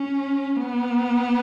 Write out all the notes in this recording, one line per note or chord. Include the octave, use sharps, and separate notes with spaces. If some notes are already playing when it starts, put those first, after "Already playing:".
Already playing: C#4
B3